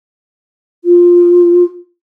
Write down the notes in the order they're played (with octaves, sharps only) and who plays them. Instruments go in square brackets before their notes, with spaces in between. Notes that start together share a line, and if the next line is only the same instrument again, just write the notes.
[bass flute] F4